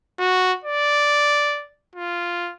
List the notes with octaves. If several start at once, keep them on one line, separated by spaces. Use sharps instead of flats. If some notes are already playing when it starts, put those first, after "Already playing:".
F#4
D5
F4